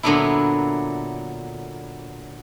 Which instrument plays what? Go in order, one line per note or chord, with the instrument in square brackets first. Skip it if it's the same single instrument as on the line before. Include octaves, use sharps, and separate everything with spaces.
[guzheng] A#2 D3 F#3 B3 D4 E4